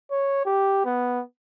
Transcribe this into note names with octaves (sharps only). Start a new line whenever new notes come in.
C#5
G4
B3